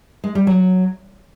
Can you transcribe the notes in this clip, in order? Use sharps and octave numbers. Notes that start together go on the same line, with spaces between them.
G#3
G3
F#3